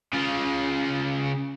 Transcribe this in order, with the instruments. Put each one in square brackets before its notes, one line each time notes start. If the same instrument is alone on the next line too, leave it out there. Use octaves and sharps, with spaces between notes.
[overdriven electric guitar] C#3 F4